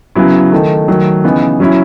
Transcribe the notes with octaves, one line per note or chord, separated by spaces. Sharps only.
C#3 F#3 B3 E4
D#3 A3 D#4
D#3 F#3 A3
C#3 E3 B3 D#4
F#3 C#4 E4